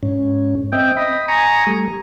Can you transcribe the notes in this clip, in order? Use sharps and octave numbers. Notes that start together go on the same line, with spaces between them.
G#2 C#4
C4 D#5 E5 G5
D#5 B5
G#5 A#5 C#6 D#6
G3 A3